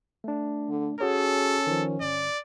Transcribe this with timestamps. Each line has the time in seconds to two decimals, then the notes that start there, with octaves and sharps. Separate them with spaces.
0.24 A3 D4
0.69 D3
1.00 C#4 F#4 G#4 A4 C#5
1.67 D#3 F3
2.01 G1 D5